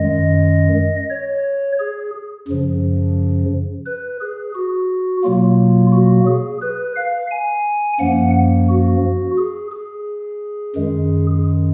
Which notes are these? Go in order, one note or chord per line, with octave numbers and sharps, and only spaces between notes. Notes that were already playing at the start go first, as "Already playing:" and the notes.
Already playing: F#2 D#3 G#3 D#5
C#5
G#4
F#2 C#3 F3
B4
G#4
F#4
B2 F#3 A#3 F4
F#4
G#4
B4
F5
G#5
F#2 F3 A#3 F#5
F#4
G#4
G#4
F#2 D#3 G#3